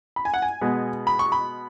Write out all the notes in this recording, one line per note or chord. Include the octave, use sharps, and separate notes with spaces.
B5
G#5
F#5
G#5
B2 G#3 B3
B5
C#6
B5